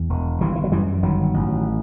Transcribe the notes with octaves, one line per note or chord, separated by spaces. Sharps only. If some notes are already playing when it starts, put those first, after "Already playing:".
Already playing: E2
E1
G1 E3 G3
E3
F#3
F#2 E3 G3
G1 D#3 F#3
A1